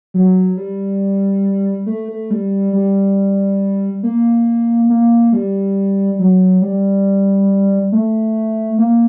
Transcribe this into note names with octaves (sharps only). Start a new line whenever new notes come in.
F#3
G3
A3
A3
G3
G3
A#3
A#3
G3
F#3
G3
A3
A#3